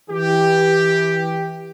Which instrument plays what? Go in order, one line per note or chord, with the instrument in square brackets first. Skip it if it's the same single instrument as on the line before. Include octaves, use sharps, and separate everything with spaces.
[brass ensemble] E3 G4